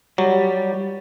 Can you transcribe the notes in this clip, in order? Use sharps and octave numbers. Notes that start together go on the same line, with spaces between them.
F#3 G3